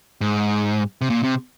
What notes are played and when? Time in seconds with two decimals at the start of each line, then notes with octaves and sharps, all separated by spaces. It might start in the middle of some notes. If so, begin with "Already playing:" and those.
0.21 G#2
1.01 C3
1.10 A#2
1.23 C3